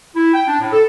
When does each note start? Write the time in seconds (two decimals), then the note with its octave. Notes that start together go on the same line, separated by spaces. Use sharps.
0.16 E4
0.33 G5
0.47 D4
0.59 A2
0.73 A4